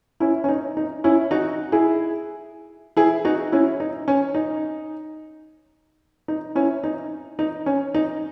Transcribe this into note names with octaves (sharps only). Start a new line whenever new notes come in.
C#4 E4
C#4
D#4
D#4
C#4 E4
D#4 F#4
E4 G#4
E4 G#4
D#4 F#4
C#4 E4
D#4
C#4
D#4
D#4
C#4 E4
D#4
D#4
C#4
D#4